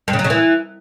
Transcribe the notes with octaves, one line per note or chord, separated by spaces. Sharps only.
G2
C#3
F#3
C#3
E3